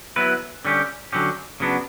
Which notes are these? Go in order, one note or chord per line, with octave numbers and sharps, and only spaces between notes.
F#3 B3 E4 B4
D3 G3 C#4 G4
D3 F#3 C#4 G4
C#3 F#3 B3 D4